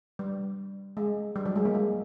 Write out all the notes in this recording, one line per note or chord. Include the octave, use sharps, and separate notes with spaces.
G3
G#3
G3
F#3
G#3
A#3
G#3